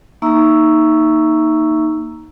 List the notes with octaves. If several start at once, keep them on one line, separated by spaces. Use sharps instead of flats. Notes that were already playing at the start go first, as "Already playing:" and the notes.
A#3 D#4 E5 A#5 C#6 E6